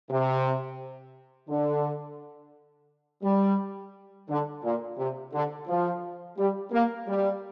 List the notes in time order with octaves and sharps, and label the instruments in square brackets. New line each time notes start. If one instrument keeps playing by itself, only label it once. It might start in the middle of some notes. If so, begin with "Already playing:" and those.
[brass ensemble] C3
D3
G3
D3
A#2
C3
D3
F3
G3
A#3
G3